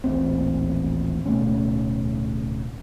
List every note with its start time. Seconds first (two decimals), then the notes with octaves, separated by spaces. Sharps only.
0.04 A1 D#2 A#2 C4
1.26 D1 B2 A3 C#4